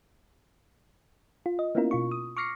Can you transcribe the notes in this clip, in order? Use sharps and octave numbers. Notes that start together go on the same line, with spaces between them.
F4
D#5
A#3 B3 C#4 E4 F4 A#4
B2 F4 C#6
D#6
C#6 D6 F6 A#6 C7 C#7